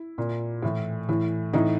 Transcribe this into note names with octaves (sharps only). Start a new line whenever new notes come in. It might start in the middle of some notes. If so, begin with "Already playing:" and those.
Already playing: E4
A#2
A2 E3
A2 E3
A2 E3 D#4